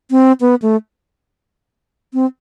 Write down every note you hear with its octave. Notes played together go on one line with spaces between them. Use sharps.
C4
B3
A3
C4